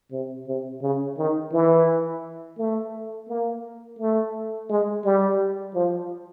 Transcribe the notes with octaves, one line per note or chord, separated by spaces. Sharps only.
C3
C3
C#3
D#3
E3
A3
A#3
A3
G#3
G3
F3